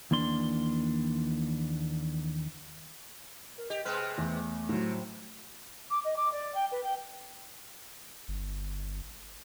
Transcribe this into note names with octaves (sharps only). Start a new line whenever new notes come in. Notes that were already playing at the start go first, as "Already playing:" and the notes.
D#2 E3 A#3 D4 C6
A#4
G4 D#5
C3 G#3 B4 F6
E2 A3
A2 C3 F#3
D6
D#5
D6
D5
G5
B4
G5
G1